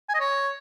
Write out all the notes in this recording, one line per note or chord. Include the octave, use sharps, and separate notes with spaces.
G#5
D#5
C#5